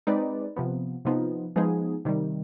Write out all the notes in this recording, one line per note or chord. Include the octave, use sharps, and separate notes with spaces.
G#3 C4 D#4 B4 D5
C3 F3 B3
C3 F3 B3 D#4
F3 G#3 B3 D#4 G#4
C3 D#3 G3